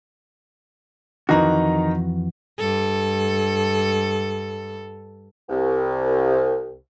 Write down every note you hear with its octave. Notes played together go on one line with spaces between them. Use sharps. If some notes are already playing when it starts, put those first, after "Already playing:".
F2 D#3 E3 D#4 F#4 A#5
G2 A4
C2